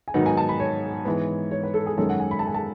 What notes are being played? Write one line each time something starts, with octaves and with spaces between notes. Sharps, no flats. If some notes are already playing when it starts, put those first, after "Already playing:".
G#5
G#2 D#3 F#3 B3 D#4 F#5
G#5
A5
B5
C#5
G#2 E3 G#3 B3
C#5
B4
A4
G#4
F#2 D#3 G#3 C#4 A4
F#5
G#5
B5
A5
G#5
A5